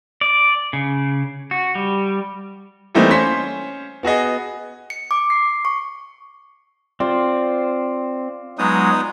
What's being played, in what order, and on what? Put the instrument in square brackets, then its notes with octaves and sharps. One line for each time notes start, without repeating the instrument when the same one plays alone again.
[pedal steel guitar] D5
C#3
F#4
G3
[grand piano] E3 G3 A3 A#3 C4 D#4
C#4 C5 C6 B6
B3 F#4 G#4 D#5
[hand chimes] C#7
D6
C7
C#6
[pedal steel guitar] C4 [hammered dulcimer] F4 D5
[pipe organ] F#3 G#3 [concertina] B3 D#4 D#6